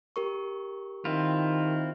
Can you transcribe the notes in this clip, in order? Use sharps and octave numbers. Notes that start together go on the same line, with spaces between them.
G4 A#4 C#6
D#3 C4 E4 F4